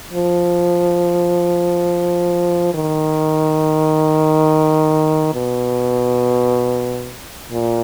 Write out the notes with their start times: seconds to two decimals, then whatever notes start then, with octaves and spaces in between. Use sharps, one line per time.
0.13 F3
2.74 D#3
5.34 B2
7.51 A#2